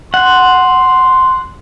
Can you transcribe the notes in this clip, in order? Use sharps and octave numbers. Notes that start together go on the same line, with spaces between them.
F#5 C6